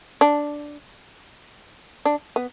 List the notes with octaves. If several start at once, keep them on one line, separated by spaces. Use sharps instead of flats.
D4
D4
B3